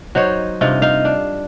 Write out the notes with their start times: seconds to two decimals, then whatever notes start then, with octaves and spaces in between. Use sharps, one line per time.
0.15 F#3 D#4 C5 C#5
0.61 G2 C3 D#4 F4
0.82 D#4 F5
1.05 D4